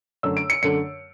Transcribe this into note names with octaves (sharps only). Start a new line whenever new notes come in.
F#2 D3 A3 E6
D7
C#7
F#2 D3 A3 C#7